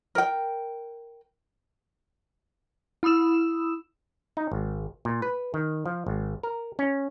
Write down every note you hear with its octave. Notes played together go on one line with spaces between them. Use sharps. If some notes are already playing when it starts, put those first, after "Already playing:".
A#4 G5
E4 B5 D#6 E6 E7
D#4
G#1
A#2
B4
D#3
F3
G#1
A#4
C#4